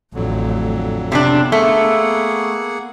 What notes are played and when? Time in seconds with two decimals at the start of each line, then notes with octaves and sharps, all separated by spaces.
0.14 A1 F2 D3 F#3
1.12 C3 B3 C4 D4
1.52 A3 A#3 G#4 F#5